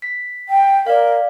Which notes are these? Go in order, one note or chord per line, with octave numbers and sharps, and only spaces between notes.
B6
G5
A#4 D5 F5